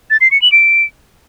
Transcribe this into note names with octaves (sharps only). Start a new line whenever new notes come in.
A6
C7
C#7
F#7
D7